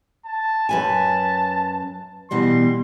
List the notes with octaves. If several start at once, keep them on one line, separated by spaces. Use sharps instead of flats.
A5
F#2 B4 G#5 A5
B2 E3 G3 C6